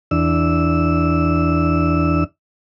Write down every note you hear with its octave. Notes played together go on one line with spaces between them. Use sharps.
E2 D4 E6